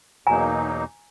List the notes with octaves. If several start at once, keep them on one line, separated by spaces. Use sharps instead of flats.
E2 B2 F#3 A#3 D#4 G#5 A#5